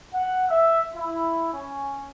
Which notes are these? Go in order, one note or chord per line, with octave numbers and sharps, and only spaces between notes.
F#5
E5
E4
C#4